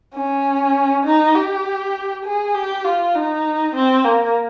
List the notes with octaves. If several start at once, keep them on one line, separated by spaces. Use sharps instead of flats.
C#4
D#4
G4
G#4
G4
F4
D#4
C4
A#3